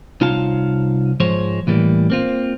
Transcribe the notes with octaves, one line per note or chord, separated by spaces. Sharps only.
C2 D#4 F4 C#5 F5 A5
G#2 F3 G#3 C5 C#5
A2 E3 G3 A#3
A#3 C4 F4